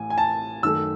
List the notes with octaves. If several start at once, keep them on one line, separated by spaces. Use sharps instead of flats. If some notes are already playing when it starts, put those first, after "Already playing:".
Already playing: A1 A2 G#5
G#5
A5
F#2 D#3 A3 E6